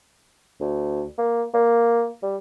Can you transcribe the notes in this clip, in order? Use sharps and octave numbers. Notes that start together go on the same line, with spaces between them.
D2
A#3
A#3
G3